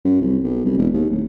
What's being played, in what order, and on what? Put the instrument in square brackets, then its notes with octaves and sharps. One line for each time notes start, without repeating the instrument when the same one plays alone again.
[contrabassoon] F#2
C2
B1
C2
E1
D#2
D1